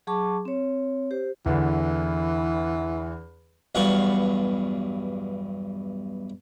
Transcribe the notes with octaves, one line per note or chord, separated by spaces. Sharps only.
F#3 G#4 A5 C#6 D6
C4 C#5
G4 C5
E2 D3 E3
B1 E2 G2 F5 F#5 C#6